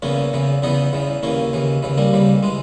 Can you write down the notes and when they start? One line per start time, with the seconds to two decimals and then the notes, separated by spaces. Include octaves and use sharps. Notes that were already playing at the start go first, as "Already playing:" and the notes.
0.02 E2 C#3 E3 A#3 C#4
0.34 E2 C#3 E3
0.62 E2 C#3 E3 B3 D#4
0.93 E2 C#3 E3
1.23 D#2 C#3 E3 A#3 C#4
1.53 D#2 C#3 E3
1.83 D#2 C#3 E3
1.98 G3 A#3
2.13 D#2 C#3 E3
2.43 E3 G#3